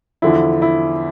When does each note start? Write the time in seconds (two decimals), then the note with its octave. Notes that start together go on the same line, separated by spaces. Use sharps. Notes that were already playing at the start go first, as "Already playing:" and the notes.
0.22 E2 D3 F3 E4
0.62 E4